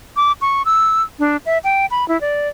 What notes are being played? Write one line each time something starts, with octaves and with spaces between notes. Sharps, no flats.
D6
C#6
E6
D4
E5
G5
B5
E4
D5